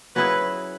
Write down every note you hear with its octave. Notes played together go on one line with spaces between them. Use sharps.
F#3 C#4 E4 G#4 B4